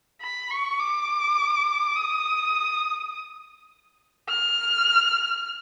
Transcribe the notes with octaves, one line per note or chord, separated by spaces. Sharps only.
B5
C#6
D6
D#6
F6